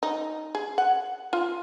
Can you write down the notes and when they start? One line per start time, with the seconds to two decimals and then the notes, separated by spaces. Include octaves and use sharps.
0.03 D#4
0.55 G#4
0.78 F#5
1.33 F4